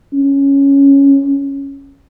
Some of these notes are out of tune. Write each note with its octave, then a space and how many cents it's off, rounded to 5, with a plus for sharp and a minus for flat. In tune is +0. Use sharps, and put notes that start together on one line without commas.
C#4 +0